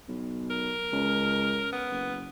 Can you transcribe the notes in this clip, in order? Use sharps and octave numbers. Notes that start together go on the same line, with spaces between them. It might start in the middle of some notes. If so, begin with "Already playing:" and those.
B1
A#4
C#2
B3
F#1